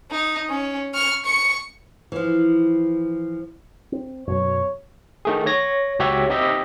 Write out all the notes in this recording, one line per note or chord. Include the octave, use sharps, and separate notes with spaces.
D#4
C#4
C#6 F6
C#6 C#7
E3 F3
C4
F#2 B2 F#3 C#5
D#3 A3 G#4
C#5 A#6
C#2 F#4 G4 C#5 E5
C4 D#4 G4 D#5 E5